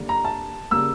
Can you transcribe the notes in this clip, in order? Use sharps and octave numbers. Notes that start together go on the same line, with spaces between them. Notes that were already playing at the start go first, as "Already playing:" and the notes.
Already playing: D3 G3 A#3
A#5
A5
C#3 G3 A#3 E6